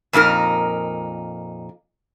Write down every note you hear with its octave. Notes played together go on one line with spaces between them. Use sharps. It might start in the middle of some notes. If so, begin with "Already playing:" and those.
F2 A#2 D#4 A#4